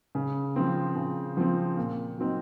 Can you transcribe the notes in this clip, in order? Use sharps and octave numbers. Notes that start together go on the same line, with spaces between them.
C#3
F3 C4
C#3
F3 C4
A#2
F#3 C4 D#4